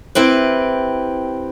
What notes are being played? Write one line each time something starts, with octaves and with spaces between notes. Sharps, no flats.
C4 E4 G4 B4